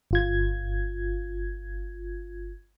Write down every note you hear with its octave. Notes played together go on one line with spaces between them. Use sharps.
G1 F4 G#6